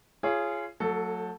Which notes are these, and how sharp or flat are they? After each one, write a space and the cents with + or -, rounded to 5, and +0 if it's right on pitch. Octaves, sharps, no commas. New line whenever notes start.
F4 -25 G#4 +5 C#5 +0
F#3 -20 A3 +35 A4 +0